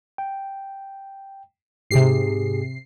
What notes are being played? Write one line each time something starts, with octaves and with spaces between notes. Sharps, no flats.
G5
G#2 C3 G4 G#4 C7